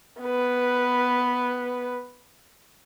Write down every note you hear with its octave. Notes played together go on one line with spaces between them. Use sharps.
B3 B4